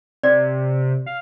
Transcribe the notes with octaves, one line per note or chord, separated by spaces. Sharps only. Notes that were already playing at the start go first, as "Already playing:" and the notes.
C3 D5
F5